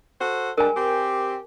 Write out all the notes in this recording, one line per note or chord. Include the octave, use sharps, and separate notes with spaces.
F#4 A4 C5
G3 G#3 D4 A#4 G#5
C4 G4